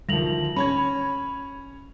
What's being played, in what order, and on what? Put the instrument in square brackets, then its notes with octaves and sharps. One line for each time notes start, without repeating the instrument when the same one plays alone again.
[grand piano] D2 D#3 F3 [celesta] A#6 F7 F#7
[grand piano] C#4 C#5 [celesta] B5 G#6